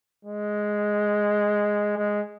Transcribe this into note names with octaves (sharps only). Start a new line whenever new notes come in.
G#3
G#3